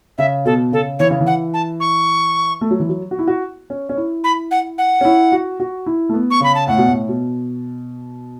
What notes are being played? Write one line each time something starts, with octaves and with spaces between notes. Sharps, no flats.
C#3 E5
B2 A4
C#3 A4
E3 C#5
C#3
E3
F#5
A5
C#6
A3
F#3
E3
F#3
F#4
E4
F#4
C#4
C#4
E4
B5
F#5
F#5
C#4
E4
F#4
F#4
E4
A3
B3
C#6
C#3 B5
A5
A2 F#5
B2
A2
B2